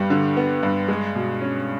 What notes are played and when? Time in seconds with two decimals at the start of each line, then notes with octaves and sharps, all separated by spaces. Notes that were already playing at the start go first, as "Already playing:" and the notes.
Already playing: G2 G3 B3
0.10 D3
0.37 B3
0.63 G2
0.88 G#3
1.15 B2
1.41 C#4